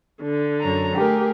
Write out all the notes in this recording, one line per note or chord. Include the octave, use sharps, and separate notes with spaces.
D3
F#2 C#5 A#5
A3 G4 G#4 A#4